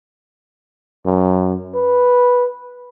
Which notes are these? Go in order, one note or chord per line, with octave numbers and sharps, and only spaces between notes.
F#2
B4